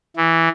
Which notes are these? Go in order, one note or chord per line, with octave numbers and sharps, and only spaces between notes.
E3